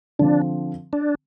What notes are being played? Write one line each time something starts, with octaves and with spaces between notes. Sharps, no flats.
D3 F3 C4 D4
D4